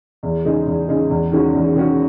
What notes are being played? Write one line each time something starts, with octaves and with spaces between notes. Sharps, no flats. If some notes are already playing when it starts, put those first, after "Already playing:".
E2
C#3 G#3 D#4 G#4
E2
C#3 G#3 D#4 G#4
E2
D#3 G#3 C#4 F#4
E2
D#3 G#3 C#4 F#4